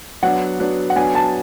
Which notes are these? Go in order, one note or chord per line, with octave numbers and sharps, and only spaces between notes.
F#3 B3 D4 F#5
F#3 B3 D4
F#5
F#3 B3 D4 G#5
A5